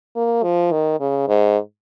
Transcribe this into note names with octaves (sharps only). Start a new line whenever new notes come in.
A#3
F3
D#3
C#3
G#2